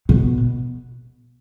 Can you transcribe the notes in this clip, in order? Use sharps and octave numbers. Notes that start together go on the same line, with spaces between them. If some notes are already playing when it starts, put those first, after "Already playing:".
B2